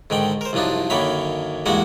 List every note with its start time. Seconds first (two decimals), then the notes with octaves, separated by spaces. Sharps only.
0.10 G#2 D3 D#3 G5
0.41 A#4 C5
0.53 C2 F#2 F3 D4 D#4
0.90 F#2 D3 D#3 A#3 C#5 B5
1.66 E2 G2 G#3 A#3 F#4 F#5